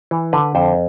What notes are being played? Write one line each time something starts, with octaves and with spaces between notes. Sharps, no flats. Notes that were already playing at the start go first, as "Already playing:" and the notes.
E3
D3 B4
F2 C5